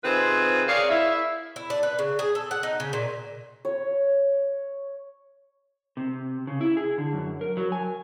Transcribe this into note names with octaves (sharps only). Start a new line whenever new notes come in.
C3 D#3 C4 F4 G#4 B4
G#4 A#4 C#5 D5 F5
E4 E5
E4
D4
B4
C#3
G#4
A4
F#5
D#4
C#3
A#2
C#5
C3
C#3
E4
G#4
D3
F#2
A#4
F#3
G#5